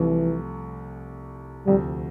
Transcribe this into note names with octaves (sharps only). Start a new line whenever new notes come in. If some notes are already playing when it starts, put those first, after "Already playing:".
Already playing: C2 C3 E3 F3 A3
D2 C3 F3 G3